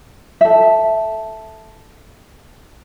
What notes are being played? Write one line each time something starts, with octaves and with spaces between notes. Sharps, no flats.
A4 E5